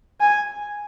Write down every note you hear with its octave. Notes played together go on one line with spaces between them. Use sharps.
G#5